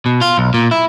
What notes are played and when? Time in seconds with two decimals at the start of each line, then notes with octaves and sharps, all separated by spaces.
0.06 B2
0.21 F4
0.38 B1
0.54 A#2
0.71 E4